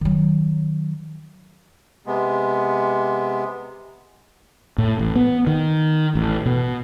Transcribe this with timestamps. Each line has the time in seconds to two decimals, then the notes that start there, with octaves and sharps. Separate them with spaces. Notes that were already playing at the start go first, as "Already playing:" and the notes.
0.01 D#3 F#3
2.06 C3 G#3 B3
4.78 A2
4.99 A1
5.16 B3
5.47 D#3
6.15 A1
6.46 B2